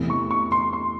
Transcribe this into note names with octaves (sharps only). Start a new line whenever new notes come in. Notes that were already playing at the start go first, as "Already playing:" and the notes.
Already playing: E2 C3 E3 A3
C#6
C#6
C6
C6